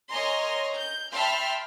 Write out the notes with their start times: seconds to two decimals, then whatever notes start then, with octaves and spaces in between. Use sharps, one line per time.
0.12 A#4 C#5 D#5 G#5 A#5 C6
0.76 G6
1.13 E5 G5 A5 B5 C6 F6